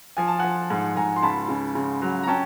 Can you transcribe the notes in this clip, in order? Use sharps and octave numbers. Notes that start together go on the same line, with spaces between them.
F3 G#5
A5
F3 F#5 G#5
G#2
G#2 G#5 A#5
C6
C#2 A5 B5
C#3
C#3
F#3
A#5
C#4 G5 A5